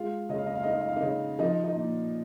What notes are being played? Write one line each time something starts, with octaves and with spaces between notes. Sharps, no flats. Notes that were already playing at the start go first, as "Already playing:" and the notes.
Already playing: G#3 F4 F5
C#3 D#5
F5
D#5
F5
D#4 D#5
F5
D#5
F5
D#4 D#5
C#3
F3 D#4 D#5
D#4 D#5
A#2